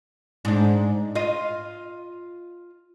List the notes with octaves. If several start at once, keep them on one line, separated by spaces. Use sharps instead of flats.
G#2 D4
F4 D#5